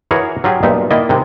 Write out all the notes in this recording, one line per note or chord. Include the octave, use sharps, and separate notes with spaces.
E3 F#4 G#4 A#4 C#5
F#3 F4 G4 G#4
B1 G2 A#2 D#4 E5
D#3 A#3 E4 D5 D#5
C3 D#3 G#3